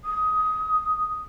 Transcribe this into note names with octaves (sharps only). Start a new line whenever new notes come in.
D#6